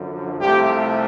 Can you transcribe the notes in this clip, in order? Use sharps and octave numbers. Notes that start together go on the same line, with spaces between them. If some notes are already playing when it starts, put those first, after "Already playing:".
Already playing: F#2 D3 F3
C2 C3 F3 A3 G4